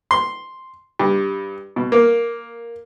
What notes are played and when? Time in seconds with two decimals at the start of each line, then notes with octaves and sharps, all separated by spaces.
0.11 C6
0.99 G2
1.76 B2
1.92 A#3